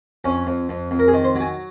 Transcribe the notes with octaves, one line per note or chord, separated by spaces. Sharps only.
F2 C#4
F2
F2
F2
A#4
G#4
D#3
C5
F#3
G#5